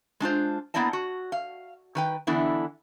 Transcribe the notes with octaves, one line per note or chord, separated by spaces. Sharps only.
G#3 D4 F4 C5
A#3 B3 E4 D5 D#5 A5
F#4
F5
D#3 B4 G5
D3 E3 B3 D4 E4